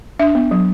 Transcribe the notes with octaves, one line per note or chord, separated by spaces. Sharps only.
D4 E5
B3
F#3